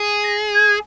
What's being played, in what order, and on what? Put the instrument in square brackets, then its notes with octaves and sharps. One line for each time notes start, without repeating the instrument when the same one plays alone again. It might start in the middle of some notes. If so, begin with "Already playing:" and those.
Already playing: [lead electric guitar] G#4
[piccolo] A#6
G#6